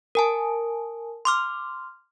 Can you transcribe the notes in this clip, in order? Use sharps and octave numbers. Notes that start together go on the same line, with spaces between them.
A#4 G#5 A5
C6 D6 F6